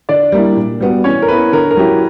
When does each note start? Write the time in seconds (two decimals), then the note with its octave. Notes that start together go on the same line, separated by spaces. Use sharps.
0.09 D3 D4 D5
0.32 G3 A#3 E4
0.56 A#2
0.80 G3 B3 F#4
1.04 E3 C#4 C#5
1.22 A#4
1.28 B3 E4 B4
1.53 D3 A#4
1.71 A#4
1.77 F#3 C#4 E4 G4